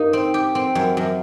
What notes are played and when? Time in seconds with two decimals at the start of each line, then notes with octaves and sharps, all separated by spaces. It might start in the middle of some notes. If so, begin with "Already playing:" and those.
Already playing: G2 A#3 D#4
0.13 C4
0.34 G4
0.55 C4
0.75 F#2
0.97 F#2